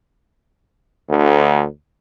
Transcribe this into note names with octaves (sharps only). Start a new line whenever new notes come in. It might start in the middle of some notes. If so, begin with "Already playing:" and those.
D2